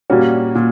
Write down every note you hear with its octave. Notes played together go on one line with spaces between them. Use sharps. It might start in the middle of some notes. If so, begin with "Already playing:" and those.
A#2 G3 A#3 C#4 F#4
A#2